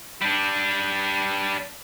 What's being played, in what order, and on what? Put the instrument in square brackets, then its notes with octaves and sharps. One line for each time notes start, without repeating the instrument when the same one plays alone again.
[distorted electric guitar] G3 D4